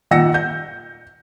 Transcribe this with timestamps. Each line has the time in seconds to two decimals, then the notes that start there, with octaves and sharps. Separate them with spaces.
0.11 A#2 D#3 F#5 E6 A#6 C#7
0.34 G6